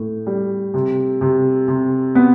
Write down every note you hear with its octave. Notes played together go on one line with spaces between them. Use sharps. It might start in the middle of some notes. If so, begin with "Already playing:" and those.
Already playing: A2
G3
C3
C3
C3
B3